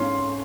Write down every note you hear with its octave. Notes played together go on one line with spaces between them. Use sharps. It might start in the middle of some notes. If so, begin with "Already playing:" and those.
Already playing: G#2 C#4 C6